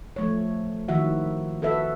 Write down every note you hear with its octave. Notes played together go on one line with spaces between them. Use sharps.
F3 A3 C#5
D#3 F3 E4 F#4 E5 F#5
F#4 A4 B4 E5